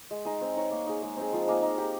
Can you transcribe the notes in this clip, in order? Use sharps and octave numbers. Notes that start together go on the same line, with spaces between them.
G#3
D#4 G#4 D#5
C4
D#4 A#4 C#5
A#3
D#4 G#4
G#3
C4 D#4 G#4
F3
A#3 D#4 G#4
D#4
G4 A#4